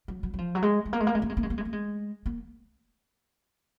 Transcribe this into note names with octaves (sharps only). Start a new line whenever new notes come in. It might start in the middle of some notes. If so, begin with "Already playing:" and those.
F#3
F#3
F#3
F3
F#3
G#3
G#3
A#3
G#3
A#3
G#3
A#3
G#3
A#3
G#3
A#3
G#3
A#3
G#3
A#3